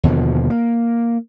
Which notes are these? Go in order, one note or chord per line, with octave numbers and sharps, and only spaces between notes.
D#2 B2 D3 F3
A#3